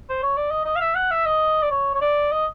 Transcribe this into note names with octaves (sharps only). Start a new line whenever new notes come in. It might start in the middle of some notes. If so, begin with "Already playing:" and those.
C5
C#5
D5
D#5
D#5
F5
E5
F#5
E5
D#5
D5
C#5
C#5
D5
D#5